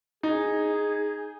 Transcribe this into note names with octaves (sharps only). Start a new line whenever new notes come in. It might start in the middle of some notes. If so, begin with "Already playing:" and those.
D#4 G#4